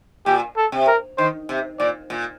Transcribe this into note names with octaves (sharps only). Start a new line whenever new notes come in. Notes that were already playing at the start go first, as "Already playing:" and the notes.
A#2 G4
A4
C3
A#4
D#3 C5
C3
A#2 D5
A#2